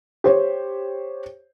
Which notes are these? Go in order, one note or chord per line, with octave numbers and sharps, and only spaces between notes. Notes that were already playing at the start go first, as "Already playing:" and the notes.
G4 C5 C#5